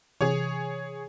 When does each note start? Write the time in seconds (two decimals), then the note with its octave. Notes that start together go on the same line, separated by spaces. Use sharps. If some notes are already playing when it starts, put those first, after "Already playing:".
0.21 C3 E3 G#4 C#5